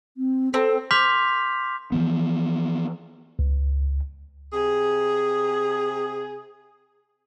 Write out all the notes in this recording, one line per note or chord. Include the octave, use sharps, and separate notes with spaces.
C4
C4 A4
C6 D6 F6 G6 B6 F7
E3 F3 B3
C#2
C3 G#4